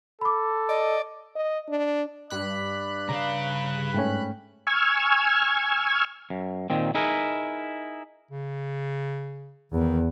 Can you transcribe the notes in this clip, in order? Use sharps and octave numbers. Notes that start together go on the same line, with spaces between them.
A4 B5 D6
D5 D#5
D#5
D4
G2 D5 B5 F#6
C#3 F5 A#5
G#2 A3 C#4 G5
G#5 C#6 E6 F6 G#6
F#2
A#2 D#3 C4
D#4 E4 G#4 A#4 B4
C#3
E2 D#3